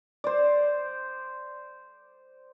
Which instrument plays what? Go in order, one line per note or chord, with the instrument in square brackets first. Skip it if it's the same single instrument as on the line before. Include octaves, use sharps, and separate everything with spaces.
[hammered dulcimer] C5 D5